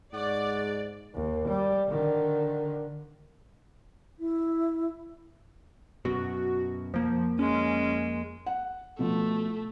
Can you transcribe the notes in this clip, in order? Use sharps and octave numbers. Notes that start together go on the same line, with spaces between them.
G#2 C#5 D5 F#5 D6
D#2
G3
D3 D#3
E4
F#2 B2 F#4
F2 F3 A#3
G#3 C#4
F#5
B2 F3 A3